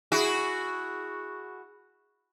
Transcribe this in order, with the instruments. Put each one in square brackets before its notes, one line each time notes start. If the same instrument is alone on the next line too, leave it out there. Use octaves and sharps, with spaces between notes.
[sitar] E4 F#4 G#4